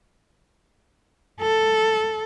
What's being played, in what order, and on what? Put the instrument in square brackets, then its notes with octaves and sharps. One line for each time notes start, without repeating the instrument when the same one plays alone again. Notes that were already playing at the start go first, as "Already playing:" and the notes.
[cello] A4